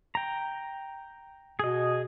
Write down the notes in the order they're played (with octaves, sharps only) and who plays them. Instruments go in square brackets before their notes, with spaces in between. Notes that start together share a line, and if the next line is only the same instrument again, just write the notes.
[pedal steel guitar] G5 A#5
[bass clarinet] B2 [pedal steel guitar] G#4 D#5